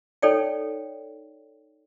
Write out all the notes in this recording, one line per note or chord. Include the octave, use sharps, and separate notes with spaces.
D#4 A4 C#5 D5 G5